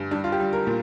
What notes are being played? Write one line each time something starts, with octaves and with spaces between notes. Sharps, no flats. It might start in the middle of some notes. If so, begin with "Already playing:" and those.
Already playing: G2
G3 D4
F4
G4
G3
A#4
A#2